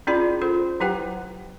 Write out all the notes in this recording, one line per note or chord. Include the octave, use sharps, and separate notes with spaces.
C#4 E4 F4 G#4 D5 B5
F4 A4 C5
F#3 E4 G4 B4 F#5 G5